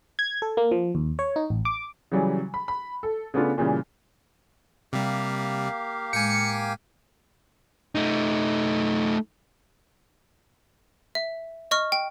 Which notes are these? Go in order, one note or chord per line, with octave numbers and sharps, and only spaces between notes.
G#6
A4
A#3
F3
D#2
C#5
D#4
A1
D6
C#3 E3 F#3 G3
B5
B5
A4
C#3 A3 B3 D4 F4
A#2 C#3 E3 G3
C3 G3 A#3 G4 F5
A2 G#3 G5 G#5 C#7
A3 D#4
E5
D#5 C#6 F6
G5